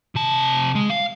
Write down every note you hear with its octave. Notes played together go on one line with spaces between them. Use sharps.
C3 A5
G#3
F5